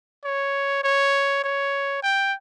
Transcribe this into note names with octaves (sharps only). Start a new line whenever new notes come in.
C#5
C#5
C#5
G5